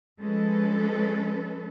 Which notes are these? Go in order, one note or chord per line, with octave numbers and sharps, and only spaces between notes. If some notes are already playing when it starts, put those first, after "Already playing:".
F3 G#3 C#4 A4 B4